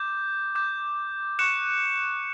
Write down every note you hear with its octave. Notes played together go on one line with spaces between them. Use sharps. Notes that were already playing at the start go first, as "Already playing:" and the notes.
Already playing: D6 G6
D6 G6
C#6 F#6 C#7 E7